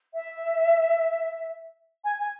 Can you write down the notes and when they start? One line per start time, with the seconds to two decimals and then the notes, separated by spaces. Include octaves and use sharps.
0.14 E5
2.04 G#5
2.20 G#5